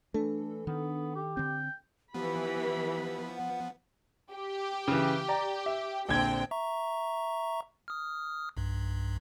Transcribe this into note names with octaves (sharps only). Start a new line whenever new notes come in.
E3 A3 D4 A4
D#3 B3
G4
D3 C4 G5
E3 F3 B3 G4 B5
F#5
G4
C#3 E3
D5 A#5
E5
A#1 D3 C4 G5 G#6
E5 A#5 C#6
D#6 F6
B1 G2